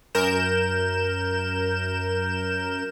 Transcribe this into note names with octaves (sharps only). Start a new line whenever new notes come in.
F#2 A#4 G6 E7